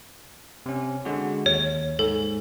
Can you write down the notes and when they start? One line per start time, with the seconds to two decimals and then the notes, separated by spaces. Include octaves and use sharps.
0.66 C3 C#4
1.05 D3 G#3 F#4
1.46 D#2 C#5
1.99 G#2 A4